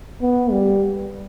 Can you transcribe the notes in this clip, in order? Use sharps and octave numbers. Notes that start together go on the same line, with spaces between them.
B3
G3